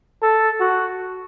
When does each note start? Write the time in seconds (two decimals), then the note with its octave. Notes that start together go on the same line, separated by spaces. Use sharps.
0.22 A4
0.60 F#4